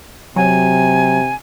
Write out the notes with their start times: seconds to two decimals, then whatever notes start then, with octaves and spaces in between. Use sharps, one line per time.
0.36 C3 F#3 G#5